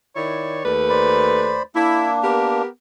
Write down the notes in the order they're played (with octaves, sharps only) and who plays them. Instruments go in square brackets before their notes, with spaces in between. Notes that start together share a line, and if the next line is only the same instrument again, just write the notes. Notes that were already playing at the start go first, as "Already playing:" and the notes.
[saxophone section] D#3 E4 C#5 [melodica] D5
[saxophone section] D#2 A3 B4
[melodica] C5 D5 B5
[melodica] A#3 D4 [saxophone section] E4
[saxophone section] B3 G4 A#4